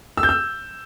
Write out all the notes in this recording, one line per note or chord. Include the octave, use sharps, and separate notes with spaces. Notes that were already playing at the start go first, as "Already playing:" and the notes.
E6
G6
E6